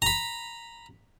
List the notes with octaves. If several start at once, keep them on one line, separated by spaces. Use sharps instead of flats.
A#5 B5